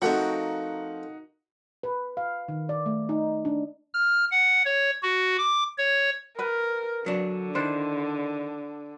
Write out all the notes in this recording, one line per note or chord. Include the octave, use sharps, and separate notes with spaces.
F3 A3 C4 D#4 F#4 A#4 F#5
B4
F5
D#3
D5
A3
D#4
D4
F6
F#5
C#5
F#4
D6
C#5
A#4 B4 B5
D3 F#3 D4
D#3 D4 E4 C5